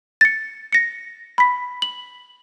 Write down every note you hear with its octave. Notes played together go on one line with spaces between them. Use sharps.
A6 C#7
A#6 C#7
B5 B6
F#7